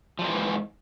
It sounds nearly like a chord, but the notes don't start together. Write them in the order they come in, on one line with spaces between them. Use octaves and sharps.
F3 G3 A#3 E3 G#2